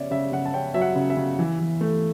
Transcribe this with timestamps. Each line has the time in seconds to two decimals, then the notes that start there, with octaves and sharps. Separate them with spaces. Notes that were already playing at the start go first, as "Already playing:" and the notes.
Already playing: C#3 C#4 C#5 D5 E5
0.11 C#3 E5
0.32 C#3 F#5
0.46 A5
0.53 C#4 G5
0.74 F#3 E5
0.81 F#5
0.95 C#3
1.10 E5
1.17 C#3
1.39 E3
1.59 E3
1.81 A3